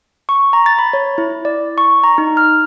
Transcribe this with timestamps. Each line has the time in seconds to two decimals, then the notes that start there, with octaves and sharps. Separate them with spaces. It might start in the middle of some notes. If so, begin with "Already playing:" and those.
0.29 C#6
0.53 A#5
0.66 A6
0.79 B5
0.93 C#5
1.18 E4
1.45 D5
1.78 C#6
2.04 A#5
2.18 D#4
2.37 F6